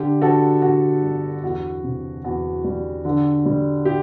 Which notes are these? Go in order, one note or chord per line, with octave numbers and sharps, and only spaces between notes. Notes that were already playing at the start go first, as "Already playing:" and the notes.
Already playing: D3 G4
D3 F#4 A4
D3 F#4
G1
E2 F#4
C3
E2 F#4
G3
D3
G3
G4